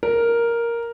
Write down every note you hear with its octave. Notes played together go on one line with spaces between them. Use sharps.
A#4